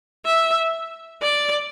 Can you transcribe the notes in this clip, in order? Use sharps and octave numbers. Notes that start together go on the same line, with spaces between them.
E5
D5